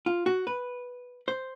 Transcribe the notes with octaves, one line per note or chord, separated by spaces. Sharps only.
F4
F#4
B4
C5